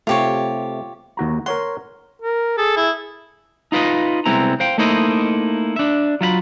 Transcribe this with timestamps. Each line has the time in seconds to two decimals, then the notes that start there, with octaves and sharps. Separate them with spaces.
0.07 C3 A3 F4 G4 C#5
1.17 D#2 F#4 A#5
1.46 A#4 C#5 F#5 C6
2.22 A#4
2.58 G#4 A4
2.76 E4
3.72 D#4 F4 B4 C5 D#5
4.26 C2 G#3 B3 C4 E4 A#5
4.60 C5 F5 G5
4.78 A3 A#3 D#4 E4 C5 D#5
5.76 D4 E5
6.21 F#3 F4 E5 B5